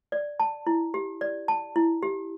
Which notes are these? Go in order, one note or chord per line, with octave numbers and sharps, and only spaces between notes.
D5
A5
E4
G4
D5
A5
E4
G4